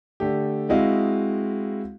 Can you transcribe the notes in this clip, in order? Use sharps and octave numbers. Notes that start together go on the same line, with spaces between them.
D3 A3 G4
G#3 C4 E4 F#4 D#5 F5